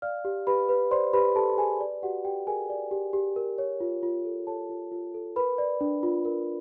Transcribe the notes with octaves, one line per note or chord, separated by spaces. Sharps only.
D5 F5 F6
G4
G4 B4 B5
B4
C5 D5 C6
G4 B4 B5
G4 A4 A5
A5
G#4 B4 G#5
D5
F#4 G4 F#5
G4 G5
G#4 A#4 G#5
D5
G4
G4
A#4
C#5
F4
F4
A4
A4 C#5 A5
F4
F4
A4
A#4 B4 B5
D5
D4
F4
A#4